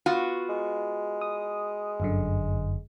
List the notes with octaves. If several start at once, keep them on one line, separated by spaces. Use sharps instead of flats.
B3 F4 F#4
G#3
D#6
G1 F#2 D3